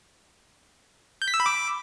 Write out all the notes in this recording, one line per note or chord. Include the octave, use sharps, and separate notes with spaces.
G6
B6
E6
B5
D6